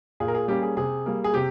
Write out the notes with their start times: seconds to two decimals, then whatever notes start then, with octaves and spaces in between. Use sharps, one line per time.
0.20 A#2 G#4
0.28 A#4
0.35 G#4
0.48 G3 A#3 C#4 G4
0.62 G#4
0.77 C3 G#4
1.06 G3 A#3
1.24 G#4
1.34 C3 G4